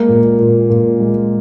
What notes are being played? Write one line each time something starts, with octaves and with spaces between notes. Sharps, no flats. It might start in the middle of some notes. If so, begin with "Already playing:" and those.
Already playing: G#3 A#3
A#2
A#2
A#2
G#3